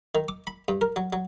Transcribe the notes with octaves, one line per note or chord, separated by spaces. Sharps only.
D#3
D6
B5
G2
A#4
F#3
F#3